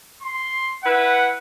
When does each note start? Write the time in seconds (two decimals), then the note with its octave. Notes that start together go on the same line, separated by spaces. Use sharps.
0.22 C6
0.84 E4 B4 F#5